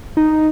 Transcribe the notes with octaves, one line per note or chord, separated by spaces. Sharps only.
D#4